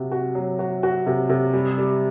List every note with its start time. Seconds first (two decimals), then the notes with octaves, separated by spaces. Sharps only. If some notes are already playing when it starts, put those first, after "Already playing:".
Already playing: C3 F#4
0.12 F#4
0.35 F#3
0.59 F#4
0.83 F#4
1.07 C3
1.29 C3
1.53 G3
1.78 G3